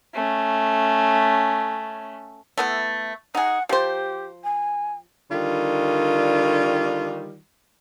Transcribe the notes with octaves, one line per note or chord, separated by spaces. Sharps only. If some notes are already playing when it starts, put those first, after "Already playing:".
A3 C#4
A3 B3 E4
D#4 G#4 F#5
F3 G4 C5
G#5
D3 D#3 G3 F4